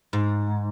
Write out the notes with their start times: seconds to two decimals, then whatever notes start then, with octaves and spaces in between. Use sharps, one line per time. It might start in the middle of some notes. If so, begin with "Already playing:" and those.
0.13 G#2